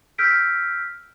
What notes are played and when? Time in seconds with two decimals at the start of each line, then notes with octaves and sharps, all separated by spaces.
0.18 E6 F6 G6 B6 D7